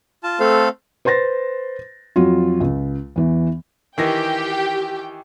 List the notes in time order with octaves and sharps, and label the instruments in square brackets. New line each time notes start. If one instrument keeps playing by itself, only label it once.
[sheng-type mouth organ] F4 A5
A3 C4 A4 C5 F5
[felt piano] B4 C5 C6 A6 A#6
F2 F#3 F4
C#2
E2 E3
[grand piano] D#3 E3 A#6 [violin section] G4 G5